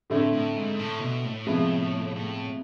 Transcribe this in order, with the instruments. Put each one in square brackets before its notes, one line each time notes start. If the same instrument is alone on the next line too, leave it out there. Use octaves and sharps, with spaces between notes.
[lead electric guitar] A2 [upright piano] D3 A3 C4 E4
[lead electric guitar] A2
G#2
A2
B2
A2
[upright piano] C3 F3 G#3 B3 E4
[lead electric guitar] A2